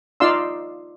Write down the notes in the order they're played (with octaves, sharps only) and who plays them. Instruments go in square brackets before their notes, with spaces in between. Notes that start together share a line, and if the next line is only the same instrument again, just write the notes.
[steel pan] D#4 F4 D5 F5 C6 E6